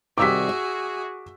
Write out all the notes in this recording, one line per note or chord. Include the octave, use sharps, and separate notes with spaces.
C3 D#3 G3 F#4 G#4 D6 E6 B6
E5